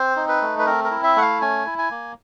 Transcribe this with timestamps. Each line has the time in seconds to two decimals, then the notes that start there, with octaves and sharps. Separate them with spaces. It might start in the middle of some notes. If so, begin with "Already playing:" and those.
Already playing: C4 C5
0.16 D#4
0.28 B4
0.41 A3
0.59 B4
0.66 C4 A#4
0.84 A#4
0.91 E4
1.04 E5
1.16 A3 F#5
1.22 F5
1.41 C#4 G#5
1.66 E4
1.78 G#5
1.91 A#3